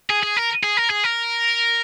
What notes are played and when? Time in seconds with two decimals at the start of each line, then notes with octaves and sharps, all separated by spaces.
0.10 G#4
0.23 G#4
0.37 A#4
0.63 G#4
0.77 A#4
0.90 G#4
1.04 A#4